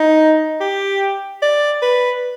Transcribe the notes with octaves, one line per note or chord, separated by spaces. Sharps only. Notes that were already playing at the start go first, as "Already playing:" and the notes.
Already playing: D#4
G4
D5
B4